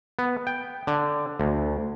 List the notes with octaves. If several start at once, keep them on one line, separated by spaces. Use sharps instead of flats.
B3
G5
D3
D2